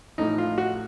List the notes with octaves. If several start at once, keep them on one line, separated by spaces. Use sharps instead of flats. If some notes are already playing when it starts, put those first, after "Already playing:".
A1 A2 F3 D#4
F4
F#4